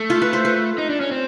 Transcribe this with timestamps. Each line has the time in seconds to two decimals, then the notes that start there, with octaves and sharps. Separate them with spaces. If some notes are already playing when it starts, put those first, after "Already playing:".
Already playing: A3
0.10 F4
0.22 B4
0.33 C5
0.45 B4
0.78 D#4
0.90 D4
1.01 C#4
1.11 C4